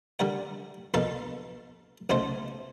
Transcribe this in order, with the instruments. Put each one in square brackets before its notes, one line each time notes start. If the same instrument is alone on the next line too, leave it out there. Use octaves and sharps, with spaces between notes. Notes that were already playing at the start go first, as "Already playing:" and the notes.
[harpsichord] D3 G3 A#4 F#5
A#1 B2 A4 A#4 F5 A5
B1 C#3 F#3 A3 C5